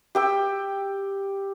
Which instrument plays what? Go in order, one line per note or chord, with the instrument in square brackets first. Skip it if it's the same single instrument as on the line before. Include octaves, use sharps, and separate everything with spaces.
[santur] G4 G5 E6